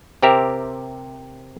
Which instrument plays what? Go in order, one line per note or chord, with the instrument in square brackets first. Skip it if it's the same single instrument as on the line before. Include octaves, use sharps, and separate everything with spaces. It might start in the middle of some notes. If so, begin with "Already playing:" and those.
[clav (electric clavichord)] C3 C4 G4 A#4 E5